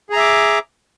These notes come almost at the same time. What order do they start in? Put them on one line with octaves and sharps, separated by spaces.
G#4 A#5 E5 D6